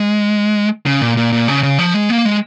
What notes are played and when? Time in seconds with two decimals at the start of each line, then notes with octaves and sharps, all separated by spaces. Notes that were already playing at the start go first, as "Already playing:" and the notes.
Already playing: G#3
0.86 C#3
1.02 A#2
1.17 A#2
1.32 A#2
1.48 C#3
1.63 C#3
1.79 F3
1.94 G#3
2.10 A#3
2.25 G#3